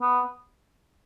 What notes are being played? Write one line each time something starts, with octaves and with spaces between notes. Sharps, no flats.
B3